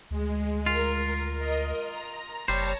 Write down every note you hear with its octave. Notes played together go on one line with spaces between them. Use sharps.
D2 G#3
F4 A#4
A#4 D#5
A#5
F#1 G3 C5 C#5 A5 A#6